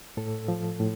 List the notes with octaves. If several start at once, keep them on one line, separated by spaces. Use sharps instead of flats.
A2 A4
F3
A2